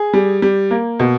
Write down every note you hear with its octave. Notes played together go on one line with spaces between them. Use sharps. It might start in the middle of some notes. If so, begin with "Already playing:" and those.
Already playing: G#4
G3
G3
A#3
B2